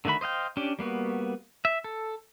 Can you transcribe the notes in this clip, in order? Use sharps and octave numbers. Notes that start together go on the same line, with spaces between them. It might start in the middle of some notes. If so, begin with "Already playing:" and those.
D3 D#3 A3 F#4 B5
C5 D#5 F5 G5
C#4 D4 G4
G3 A#3 B3 F#4
E5
A4